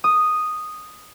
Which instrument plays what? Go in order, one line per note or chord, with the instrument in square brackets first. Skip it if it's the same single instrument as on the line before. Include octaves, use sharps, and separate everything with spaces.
[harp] D#6